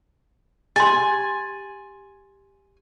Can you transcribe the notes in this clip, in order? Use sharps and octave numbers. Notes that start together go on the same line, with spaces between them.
G4 G#5 C6 A6